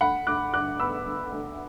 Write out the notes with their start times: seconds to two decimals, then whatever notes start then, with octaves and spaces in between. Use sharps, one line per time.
0.01 D2 F#5 B5
0.27 D2 D6 F#6
0.53 D3 D6 F#6
0.80 B3 B5 E6
1.06 D2
1.32 D2